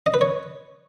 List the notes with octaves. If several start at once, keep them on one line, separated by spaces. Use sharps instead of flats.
D#5
B4
C#5